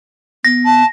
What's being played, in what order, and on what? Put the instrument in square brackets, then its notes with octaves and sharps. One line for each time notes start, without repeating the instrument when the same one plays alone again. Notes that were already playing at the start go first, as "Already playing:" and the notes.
[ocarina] B3 [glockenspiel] A#6
[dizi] A5